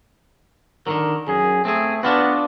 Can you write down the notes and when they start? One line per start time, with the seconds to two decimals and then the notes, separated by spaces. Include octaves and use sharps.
0.87 D3 D#3 F#3 A#4
1.28 F#2 G#4
1.65 A3 C4 G#4
2.03 B3 D4 F4 F#4